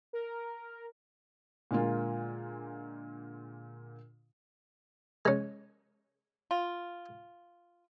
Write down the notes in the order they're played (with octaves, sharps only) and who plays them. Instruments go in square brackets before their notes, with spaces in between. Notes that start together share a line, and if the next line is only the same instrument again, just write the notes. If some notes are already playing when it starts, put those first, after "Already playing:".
[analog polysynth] A#4
[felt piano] A#2 D3 G#3 A#3 F4
[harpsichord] G#3 C#4
[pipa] F4